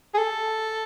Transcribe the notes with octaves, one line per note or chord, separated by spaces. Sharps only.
G#4
A4